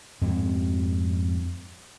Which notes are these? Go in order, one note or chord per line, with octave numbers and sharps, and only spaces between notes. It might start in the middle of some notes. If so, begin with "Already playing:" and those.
F2 G#2 G#3 C4